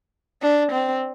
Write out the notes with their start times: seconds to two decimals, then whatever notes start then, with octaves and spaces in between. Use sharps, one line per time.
0.42 D4
0.72 C4